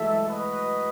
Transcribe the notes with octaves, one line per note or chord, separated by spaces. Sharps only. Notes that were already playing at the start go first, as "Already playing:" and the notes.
Already playing: E3 F#3 G#3 A3 A4 E5
F#4 B4 D#5